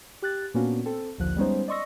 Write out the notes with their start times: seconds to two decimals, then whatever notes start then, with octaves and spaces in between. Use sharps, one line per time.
0.22 G4 F#6 A6
0.54 A#2 A#3 B3 C#4 D4 F#4
0.86 C4 A4
1.18 A#1 D#2 D3 F3 F#6
1.36 G3 G#3 B3 C#4 D#4 C5
1.68 D5 D#5 C6 C#6 E6 A#6